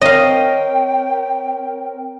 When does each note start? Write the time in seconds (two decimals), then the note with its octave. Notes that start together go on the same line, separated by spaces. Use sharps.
0.01 C4 A#4 C#5 D#5 F5 G5